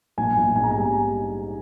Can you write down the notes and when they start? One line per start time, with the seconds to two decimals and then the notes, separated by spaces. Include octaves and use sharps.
0.17 A#1 G#5
0.37 A#1
0.56 G#2 G#5
0.64 A#5
0.71 G3 G#5